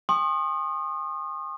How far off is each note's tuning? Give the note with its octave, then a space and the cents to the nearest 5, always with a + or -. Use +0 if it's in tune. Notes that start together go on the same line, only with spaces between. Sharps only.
G#5 -45 C6 +45 D#6 -25